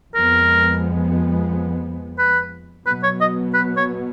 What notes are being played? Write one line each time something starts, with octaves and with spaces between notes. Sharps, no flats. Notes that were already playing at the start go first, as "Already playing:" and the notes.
F2 F3 G#3 B3 A#4
B4
B2 F#3 B3 B4
C#5
D#5
B4
C#5